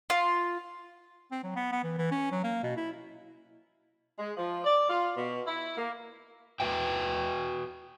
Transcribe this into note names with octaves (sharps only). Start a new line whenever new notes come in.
F4
C4
F#3
B3
B3
E3
E3
C#4
F#3
A#3
B2
E4
G#3
F3
D5
F4
B2
E4
A#3
F#4 B4 E5 G5